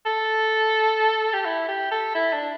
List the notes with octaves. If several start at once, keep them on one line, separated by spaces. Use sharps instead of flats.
A4
G4
E4
G4
A4
E4
D4